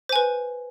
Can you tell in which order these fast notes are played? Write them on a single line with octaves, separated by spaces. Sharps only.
C5 G#5 B4